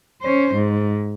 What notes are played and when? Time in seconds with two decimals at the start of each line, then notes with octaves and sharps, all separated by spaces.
0.22 C#4 C5
0.54 G#2